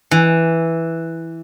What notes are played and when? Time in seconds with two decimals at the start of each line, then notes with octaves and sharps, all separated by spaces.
0.11 E3